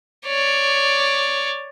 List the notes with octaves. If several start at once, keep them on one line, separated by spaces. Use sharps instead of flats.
C#5 D5